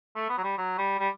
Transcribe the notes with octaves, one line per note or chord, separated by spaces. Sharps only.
A3
B3
F#3
G3
F#3
G3
G3